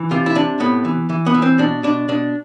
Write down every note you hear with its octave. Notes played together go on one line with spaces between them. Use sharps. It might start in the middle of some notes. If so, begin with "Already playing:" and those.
Already playing: E3
C3 F4
E4
C3 D4
A2 B3
E3
E3
B3
E3
C4
B2 D4
B2 D4
B2 D4